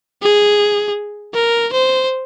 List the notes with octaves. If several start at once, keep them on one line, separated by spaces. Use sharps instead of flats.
G#4
A#4
C5